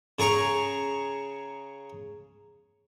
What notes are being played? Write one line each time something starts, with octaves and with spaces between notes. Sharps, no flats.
C#3 G#4 A#5 C#6